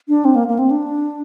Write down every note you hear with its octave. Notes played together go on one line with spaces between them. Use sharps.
D4
C4
A#3
A#3
C4
D4